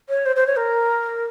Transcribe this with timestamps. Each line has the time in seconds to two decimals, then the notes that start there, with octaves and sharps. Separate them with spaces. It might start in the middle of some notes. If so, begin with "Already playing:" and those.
0.09 C#5
0.25 C5
0.36 C5
0.47 C#5
0.57 A#4